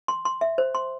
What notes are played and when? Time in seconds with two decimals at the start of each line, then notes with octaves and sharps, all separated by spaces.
0.08 C6
0.25 C6
0.41 E5
0.58 C5
0.75 C6